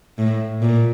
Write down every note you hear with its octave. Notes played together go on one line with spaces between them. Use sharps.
A2
A#2